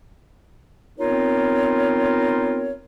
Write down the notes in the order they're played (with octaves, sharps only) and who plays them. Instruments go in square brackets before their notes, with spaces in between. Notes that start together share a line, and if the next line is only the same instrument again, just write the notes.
[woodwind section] B3 C4 D#4 F4 A#4 C#5